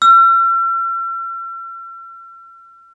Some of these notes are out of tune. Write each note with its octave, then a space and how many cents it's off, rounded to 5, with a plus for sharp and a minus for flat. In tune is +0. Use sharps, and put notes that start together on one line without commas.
E6 +45